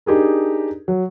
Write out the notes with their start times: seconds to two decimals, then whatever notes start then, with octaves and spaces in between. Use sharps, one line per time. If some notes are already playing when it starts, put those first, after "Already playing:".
0.06 D4 D#4 G4 G#4 A#4
0.88 F#3